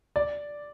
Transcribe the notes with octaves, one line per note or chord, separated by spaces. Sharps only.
D5